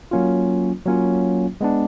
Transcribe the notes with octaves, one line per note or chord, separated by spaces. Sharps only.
F#3 A#3 C#4 F4
F#3 A#3 C#4 F4
G#3 B3 D4